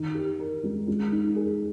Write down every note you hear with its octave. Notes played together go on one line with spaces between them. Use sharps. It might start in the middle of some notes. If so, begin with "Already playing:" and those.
Already playing: D#3 D#4
G4
A#4
G#3
G#3
D#4
G#4